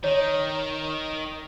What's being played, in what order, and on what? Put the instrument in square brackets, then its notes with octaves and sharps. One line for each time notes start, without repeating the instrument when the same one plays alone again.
[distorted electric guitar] D#3 [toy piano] C#5